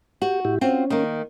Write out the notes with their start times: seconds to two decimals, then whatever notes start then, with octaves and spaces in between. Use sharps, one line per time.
0.22 F#4 G4
0.45 A2 E4 G4
0.61 C4 C#4 F4 F#4
0.90 D#3 A#3